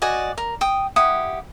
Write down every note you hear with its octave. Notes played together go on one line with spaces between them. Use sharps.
F#4 D5 D#5 G#5
A#4
G5 D#6
E4 G4 F#5 D#6